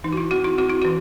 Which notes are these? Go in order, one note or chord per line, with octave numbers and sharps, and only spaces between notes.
E3 D#4
F#4
E4
C4 F#4
E4
C4 F#4
E4
E3 F#4